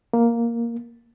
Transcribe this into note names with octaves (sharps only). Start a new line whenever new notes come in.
A#3